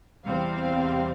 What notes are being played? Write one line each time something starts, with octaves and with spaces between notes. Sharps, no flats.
E2 C3 G3 C4 F5